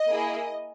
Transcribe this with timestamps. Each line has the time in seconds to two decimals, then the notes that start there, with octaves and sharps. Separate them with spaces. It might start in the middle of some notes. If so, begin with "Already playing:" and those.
Already playing: D#5
0.08 A#3 E4 G#4